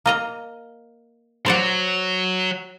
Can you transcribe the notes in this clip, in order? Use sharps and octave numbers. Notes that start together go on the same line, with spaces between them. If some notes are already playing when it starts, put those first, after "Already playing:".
A#3 D#5 A#5
F#3 C5 D5 F#5